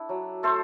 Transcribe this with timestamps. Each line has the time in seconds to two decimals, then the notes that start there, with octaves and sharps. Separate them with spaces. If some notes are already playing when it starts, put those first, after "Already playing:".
Already playing: D4 E4 A4
0.09 F#3
0.43 A3 A4 C5